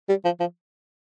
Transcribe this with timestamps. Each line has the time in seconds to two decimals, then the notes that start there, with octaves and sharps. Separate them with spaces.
0.09 G3
0.25 F3
0.40 F3